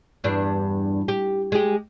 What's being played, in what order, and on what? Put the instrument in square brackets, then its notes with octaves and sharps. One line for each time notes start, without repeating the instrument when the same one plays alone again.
[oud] E2 G2 D4
G4
G#3 G4